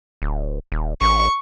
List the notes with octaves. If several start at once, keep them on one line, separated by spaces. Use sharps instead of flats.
D1
D#1
A1 C#6